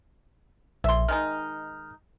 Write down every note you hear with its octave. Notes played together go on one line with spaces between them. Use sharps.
A#1 E5 C6
D#3 G#3 D#4 F6